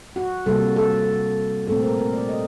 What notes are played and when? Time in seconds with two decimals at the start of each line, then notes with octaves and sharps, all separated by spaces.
0.16 F#4
0.46 C3 G3 A#3 A4
0.76 A4
1.67 A#2 A3 C4 A4
1.83 A#4
1.98 A#4
2.13 D5
2.29 D#5